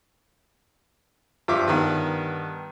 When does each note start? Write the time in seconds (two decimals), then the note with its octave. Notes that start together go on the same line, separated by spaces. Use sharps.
1.48 G2 F3 F4 E5 D6
1.68 G2 D#3 B3